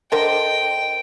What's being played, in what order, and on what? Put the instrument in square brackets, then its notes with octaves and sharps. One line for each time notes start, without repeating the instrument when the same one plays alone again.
[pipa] D3 A#4 C5 [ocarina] D#5 [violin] G5